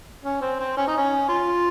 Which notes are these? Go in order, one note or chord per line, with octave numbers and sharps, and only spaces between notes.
C#4
C4
C4
C#4
D#4
C#4
F4